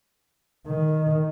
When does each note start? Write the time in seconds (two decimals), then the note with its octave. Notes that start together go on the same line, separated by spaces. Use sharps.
0.67 D#3